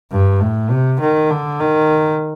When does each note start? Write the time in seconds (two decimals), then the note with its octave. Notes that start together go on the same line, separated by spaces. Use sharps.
0.12 G2
0.41 A2
0.70 C3
1.00 D#3
1.31 D3
1.60 D#3